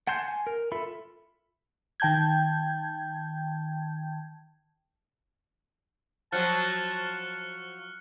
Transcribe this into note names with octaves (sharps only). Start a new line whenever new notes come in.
F#5 G#5 A5 C6 G6
G#5
A#4
F4 A4 E5 B5
D#3 G5 A5 G6 G#6
F3 F#3 A5 F6 F#6 C#7